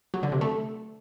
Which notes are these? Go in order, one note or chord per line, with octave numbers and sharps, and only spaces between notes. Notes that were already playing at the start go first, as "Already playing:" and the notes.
F#3
D3
C3
A3